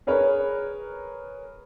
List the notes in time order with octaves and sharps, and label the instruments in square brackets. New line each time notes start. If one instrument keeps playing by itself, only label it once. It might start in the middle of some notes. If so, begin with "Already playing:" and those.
[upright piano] G#4 A#4 B4 C#5